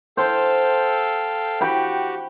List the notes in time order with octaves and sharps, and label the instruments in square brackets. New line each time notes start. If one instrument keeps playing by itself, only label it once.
[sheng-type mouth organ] A4 F5 G5 [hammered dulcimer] C5
[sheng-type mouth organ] F#4 G4 [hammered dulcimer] G5 B5